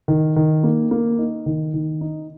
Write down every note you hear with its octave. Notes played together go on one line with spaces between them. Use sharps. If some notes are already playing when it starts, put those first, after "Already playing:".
D#3
D#3
A#3
A#3
D#4
D#3
D#3
D#4